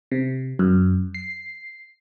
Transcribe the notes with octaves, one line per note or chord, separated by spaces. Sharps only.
C3
F#2
C7